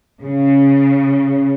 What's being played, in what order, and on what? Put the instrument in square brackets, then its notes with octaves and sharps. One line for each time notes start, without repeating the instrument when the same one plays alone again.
[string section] C#3